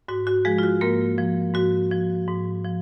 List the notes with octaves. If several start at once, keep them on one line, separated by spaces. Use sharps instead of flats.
G#2 F#4
F#4
F3 G#3 G#4
F4
F#4
G#2 A#3 A#4
F3
G#2 F#4
F3
G#2
F3